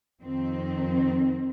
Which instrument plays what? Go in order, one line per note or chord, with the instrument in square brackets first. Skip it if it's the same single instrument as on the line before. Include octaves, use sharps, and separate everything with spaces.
[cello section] F2 D#3 C4